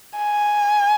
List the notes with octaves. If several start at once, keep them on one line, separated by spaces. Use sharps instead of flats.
G#5